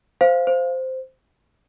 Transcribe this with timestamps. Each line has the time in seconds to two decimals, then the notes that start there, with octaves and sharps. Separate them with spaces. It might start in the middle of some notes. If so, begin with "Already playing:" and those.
0.21 C5 F5
0.47 C5